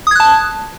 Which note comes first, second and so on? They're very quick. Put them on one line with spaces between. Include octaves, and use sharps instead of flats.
D#6 G#6 F#6 A5